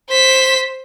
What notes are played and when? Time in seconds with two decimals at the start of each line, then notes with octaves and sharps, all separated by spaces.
0.10 C5 B6